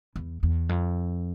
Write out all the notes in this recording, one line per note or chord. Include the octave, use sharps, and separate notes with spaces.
E2
E2
F2